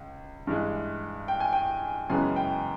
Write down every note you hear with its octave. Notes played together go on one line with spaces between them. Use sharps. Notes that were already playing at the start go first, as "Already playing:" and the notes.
Already playing: C#2
G2 E3 G#3
G5
G#5
G5
F#2 C#3 E3 G#3 B3 G#5
G5